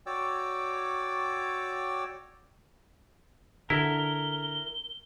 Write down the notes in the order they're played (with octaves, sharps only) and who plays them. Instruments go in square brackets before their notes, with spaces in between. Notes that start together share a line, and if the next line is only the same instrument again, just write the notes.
[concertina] F#4 C#5 D5 G5 D6 E6
[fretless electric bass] D3 [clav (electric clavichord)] E4 [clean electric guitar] A#4 [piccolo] G7